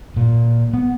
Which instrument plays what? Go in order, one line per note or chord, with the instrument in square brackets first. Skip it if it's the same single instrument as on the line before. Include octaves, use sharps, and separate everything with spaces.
[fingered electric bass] A#2
B3